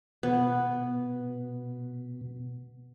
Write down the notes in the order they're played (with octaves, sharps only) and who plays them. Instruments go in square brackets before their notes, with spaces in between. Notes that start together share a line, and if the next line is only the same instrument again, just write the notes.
[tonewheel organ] B2 [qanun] B3